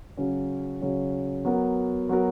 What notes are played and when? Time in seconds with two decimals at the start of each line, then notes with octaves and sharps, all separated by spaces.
0.17 C#3 F#3 C#4
0.82 C#3 F#3 C#4
1.45 F#3 B3 F#4 A#4
2.09 F#3 B3 F#4 A#4